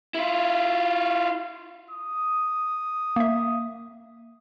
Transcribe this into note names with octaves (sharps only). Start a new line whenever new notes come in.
E4 F4
D#6
A#3 E5